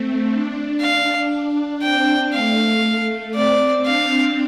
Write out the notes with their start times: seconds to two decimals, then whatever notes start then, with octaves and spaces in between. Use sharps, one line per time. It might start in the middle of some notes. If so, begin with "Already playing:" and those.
Already playing: A3 C4
0.31 D4
0.81 F5
1.82 C4 G5
2.32 A3 F5
3.34 C4 D5
3.85 D4 F5